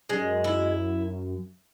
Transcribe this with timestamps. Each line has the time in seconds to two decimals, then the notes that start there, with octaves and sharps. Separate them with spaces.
0.09 F#2 G#3
0.44 E4